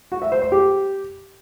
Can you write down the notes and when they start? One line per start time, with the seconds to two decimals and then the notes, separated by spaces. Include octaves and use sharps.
0.12 F#4
0.22 E5
0.32 C5
0.42 C5
0.52 G4